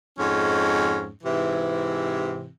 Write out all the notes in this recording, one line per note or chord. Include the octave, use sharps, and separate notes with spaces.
F2 G#2 G#3 C#4
G#2 C3 E3